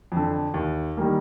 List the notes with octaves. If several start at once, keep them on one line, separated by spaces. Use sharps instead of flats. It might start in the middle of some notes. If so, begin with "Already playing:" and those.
F2 D3
D#2
D#3 G3 A#3